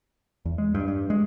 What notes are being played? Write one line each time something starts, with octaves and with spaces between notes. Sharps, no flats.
E2
G#3
G2
G2
G#3